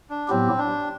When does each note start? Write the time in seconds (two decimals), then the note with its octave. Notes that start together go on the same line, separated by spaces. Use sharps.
0.10 D4
0.28 A2 F#3 B3 C4 E4 G4
0.58 D4